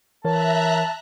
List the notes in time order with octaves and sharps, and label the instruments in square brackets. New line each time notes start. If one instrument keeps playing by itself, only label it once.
[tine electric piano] E3 A#4 C#5 [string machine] E5 A#5 F#6 [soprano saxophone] A5